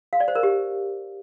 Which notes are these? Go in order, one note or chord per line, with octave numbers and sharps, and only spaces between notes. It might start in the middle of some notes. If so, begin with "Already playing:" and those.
F5
D5
C5
A#4
G4